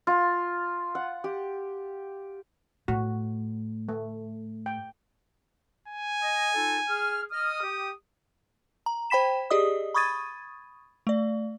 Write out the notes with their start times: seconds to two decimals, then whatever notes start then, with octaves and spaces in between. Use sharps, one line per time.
0.07 F4
0.95 F#5
1.24 G4
2.88 A2 F#4
3.89 A3
4.66 G5
5.88 G#5
6.22 D#5
6.54 D#4 F4 A4
6.88 G#4 F6
7.32 D#5 D#6 F6
7.63 G4
8.86 A#5
9.10 C5 G5 B5 B6 E7
9.50 G4 G#4 D5 D#5 D#6
9.94 B5 C#6 D#6 G#6 A6 D#7
11.07 A3 D5